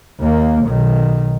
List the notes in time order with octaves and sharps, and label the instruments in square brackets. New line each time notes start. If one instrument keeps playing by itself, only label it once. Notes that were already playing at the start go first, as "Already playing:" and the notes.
[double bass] D#2 A#3
B1 D#3